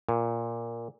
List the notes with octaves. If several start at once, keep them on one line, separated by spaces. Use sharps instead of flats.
A#2